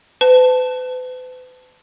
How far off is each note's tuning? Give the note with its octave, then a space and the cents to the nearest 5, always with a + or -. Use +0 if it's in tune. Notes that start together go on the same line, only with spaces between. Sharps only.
B4 +40 A5 +0